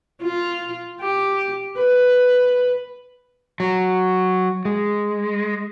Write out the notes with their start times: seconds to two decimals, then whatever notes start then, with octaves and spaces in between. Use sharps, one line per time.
0.23 F4
1.01 G4
1.78 B4
3.60 F#3
4.65 G#3